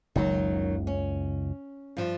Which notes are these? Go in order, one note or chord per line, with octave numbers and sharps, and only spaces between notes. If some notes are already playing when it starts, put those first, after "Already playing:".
F#1 C#2 D#3 F#3
C#4
G2 F3